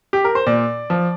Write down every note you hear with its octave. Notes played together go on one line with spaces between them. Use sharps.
G4
A#4
C5
A#2 D5
F3